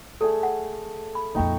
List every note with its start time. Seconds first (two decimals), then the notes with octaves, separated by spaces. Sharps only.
0.21 A3 G#4 A4 D5
0.43 F#5
1.15 B5
1.35 F2 A#2 D#4 G5 C#6